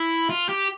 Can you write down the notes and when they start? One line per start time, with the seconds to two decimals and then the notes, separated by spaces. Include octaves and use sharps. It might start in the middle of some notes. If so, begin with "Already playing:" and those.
Already playing: E4
0.30 F4
0.49 G4